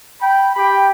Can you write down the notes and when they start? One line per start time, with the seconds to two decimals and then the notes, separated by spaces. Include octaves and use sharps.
0.21 G5 B5
0.56 G4 G5 B5